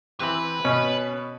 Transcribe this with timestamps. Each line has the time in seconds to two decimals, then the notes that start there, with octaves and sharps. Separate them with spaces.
0.20 E3 C4 G4 B4 B5
0.65 B2 C#4